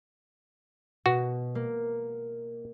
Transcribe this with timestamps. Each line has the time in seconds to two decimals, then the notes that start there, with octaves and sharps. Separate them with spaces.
1.06 B2 F#4
1.55 A#3